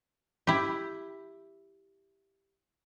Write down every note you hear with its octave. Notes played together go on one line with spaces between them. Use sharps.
E4 G4